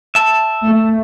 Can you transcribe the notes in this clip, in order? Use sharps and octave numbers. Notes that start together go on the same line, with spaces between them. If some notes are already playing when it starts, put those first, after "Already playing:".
E5 A5
A3